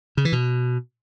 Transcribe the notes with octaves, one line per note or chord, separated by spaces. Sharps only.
C#3
E3
B2